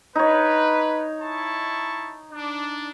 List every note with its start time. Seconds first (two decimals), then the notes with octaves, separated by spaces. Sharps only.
0.16 D#4 B4 C#5
1.22 E4 A5 C#6
2.32 D4